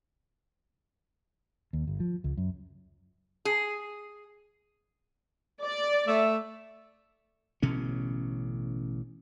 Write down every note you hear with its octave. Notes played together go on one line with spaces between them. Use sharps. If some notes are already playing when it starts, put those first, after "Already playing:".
D#2
G1
F3
C#2
F#2
G#4
D5
A3 E5
A1 B2 D3 C#4